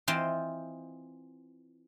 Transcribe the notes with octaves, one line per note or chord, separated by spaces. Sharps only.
E3 C4 F4 D#5 G5 C6